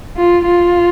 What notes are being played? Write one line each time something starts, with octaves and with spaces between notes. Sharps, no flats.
F4
F4